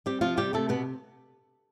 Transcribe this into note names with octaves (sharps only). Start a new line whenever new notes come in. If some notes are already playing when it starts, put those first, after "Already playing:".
G3 C4 G4
C3 F3 F4
C3 G3 G4
C3 A3 A4
B2 B3 B4